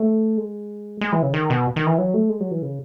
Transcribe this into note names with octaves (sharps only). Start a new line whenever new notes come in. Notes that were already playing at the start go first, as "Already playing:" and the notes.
Already playing: A3
G#3
G#3
E3
C#3
D#3
B2
D#3
E3
F#3
A3
G#3
F#3
E3
C#3